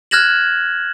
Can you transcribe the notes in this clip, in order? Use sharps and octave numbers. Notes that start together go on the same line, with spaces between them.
F6 F#6 G#6 A#6 E7 F#7